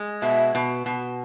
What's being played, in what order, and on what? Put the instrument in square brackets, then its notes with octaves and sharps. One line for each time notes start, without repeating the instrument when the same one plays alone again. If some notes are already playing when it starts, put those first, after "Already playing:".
Already playing: [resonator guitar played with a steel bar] G#3
[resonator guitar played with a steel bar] B2 [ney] E5
[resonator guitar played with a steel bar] B2
B2